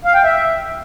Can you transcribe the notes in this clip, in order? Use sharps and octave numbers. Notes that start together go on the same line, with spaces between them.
F5
G5
E5